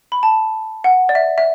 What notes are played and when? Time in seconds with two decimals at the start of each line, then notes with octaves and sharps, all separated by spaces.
0.12 B5
0.23 A5
0.84 F#5
1.09 D5
1.15 E5
1.38 E5